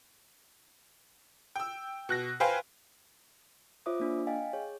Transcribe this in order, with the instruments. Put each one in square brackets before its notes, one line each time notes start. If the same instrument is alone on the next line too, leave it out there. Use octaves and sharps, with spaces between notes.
[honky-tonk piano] G5 E6
B2 F#6 A#6
B4 C5 F5 G5 G#5
[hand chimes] F4 C5 C#5 E5 D6 D#6
A#3 D4
D#5 F5 G5 G#5
G#4 C#5